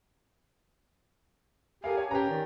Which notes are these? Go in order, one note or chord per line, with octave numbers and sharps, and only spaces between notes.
G4 A4 A#4 F5 G#5
C#5 A5
C#4 G4 B4 A#5
D#3 D5